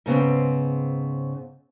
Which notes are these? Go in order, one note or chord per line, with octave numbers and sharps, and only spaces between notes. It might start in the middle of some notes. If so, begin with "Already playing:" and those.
G#2 C#3 B3 C4